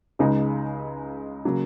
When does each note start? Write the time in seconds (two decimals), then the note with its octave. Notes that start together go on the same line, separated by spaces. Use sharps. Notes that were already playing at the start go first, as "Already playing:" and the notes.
0.19 C#2 C#3 G#3 D#4
1.45 C#3 F#3 A#3